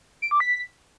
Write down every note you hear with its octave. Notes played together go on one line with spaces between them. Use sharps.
D7
D6
B6